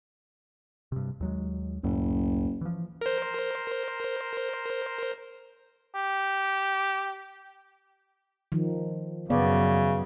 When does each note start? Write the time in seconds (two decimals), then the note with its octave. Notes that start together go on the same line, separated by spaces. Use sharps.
0.92 G2 C3
1.20 D#2 F#3 G#3
1.83 F#1 C#2 F#2 A2
2.61 E3 F3
3.01 A#4 C5
5.95 G4
8.52 D#3 F3
9.30 F#2 C#3 B3 D5